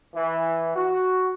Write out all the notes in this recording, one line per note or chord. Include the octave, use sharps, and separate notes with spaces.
E3
F#4